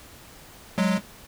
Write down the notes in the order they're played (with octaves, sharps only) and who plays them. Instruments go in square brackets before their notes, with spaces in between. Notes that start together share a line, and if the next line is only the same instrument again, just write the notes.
[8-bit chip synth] F#3 G#3